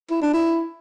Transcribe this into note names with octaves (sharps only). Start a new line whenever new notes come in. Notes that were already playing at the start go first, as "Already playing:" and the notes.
E4
D4
E4